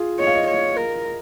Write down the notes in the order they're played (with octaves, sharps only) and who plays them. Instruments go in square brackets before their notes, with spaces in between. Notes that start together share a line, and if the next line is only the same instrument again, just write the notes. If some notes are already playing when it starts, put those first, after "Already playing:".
Already playing: [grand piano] F4 G#4
[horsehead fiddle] C#5 [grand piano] D#5
[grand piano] F5
D#5
[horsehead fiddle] C#5
A#4